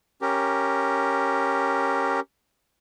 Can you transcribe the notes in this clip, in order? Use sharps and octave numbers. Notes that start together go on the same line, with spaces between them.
C#4 G4 A#4